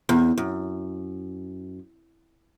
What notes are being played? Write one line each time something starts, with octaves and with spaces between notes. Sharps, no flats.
E2
F#2